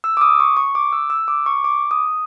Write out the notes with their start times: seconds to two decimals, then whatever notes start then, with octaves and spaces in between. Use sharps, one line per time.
0.04 E6
0.17 D6
0.21 D#6
0.40 C#6
0.57 C#6
0.75 D6
0.92 E6
1.10 E6
1.28 D6
1.46 C#6
1.64 D6
1.91 D#6